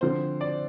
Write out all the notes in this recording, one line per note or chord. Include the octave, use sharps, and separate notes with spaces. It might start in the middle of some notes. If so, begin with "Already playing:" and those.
D3 F3 C4 C5
D5